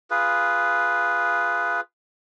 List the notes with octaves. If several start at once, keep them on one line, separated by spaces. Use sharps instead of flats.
F4 G#4 B4